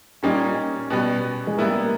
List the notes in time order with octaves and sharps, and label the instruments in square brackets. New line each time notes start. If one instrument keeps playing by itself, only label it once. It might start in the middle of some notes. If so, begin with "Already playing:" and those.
[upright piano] A#2 G3 A#3 D#4 [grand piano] C#4
[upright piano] B2 G3 B3
[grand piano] G#3
[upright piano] G3 B3 E4 [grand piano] A#3